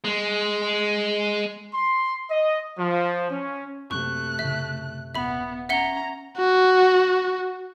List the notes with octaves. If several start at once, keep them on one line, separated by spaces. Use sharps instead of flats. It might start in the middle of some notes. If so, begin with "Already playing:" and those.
G#3
C6
D#5
F3
C#4
F#2 C3 A3 A#3 C4 C#6 F#6
A2 C#3 E5
D#1 B3 E5 B5
C#4 E5 F#5 A#5 G7
F#4